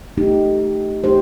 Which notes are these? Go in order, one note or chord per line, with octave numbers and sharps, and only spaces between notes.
A3 D#4 G4
A3 D#4 G4 C5